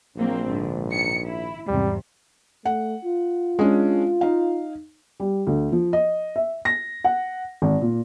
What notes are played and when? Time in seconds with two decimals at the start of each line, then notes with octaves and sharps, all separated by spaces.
0.16 A#1 F#3 A#3 C4
0.49 G#2 D3
0.89 D#3 C#7
1.24 E4
1.68 E2 G#2 C3 G3
2.65 A3 F#5
3.05 F4
3.59 G#3 C#4 D4
4.21 D#4 F5
5.20 G3
5.47 D2
5.72 F3
5.93 D#5
6.36 E5
6.65 A#6
7.04 F#5
7.62 G#1
7.82 A#2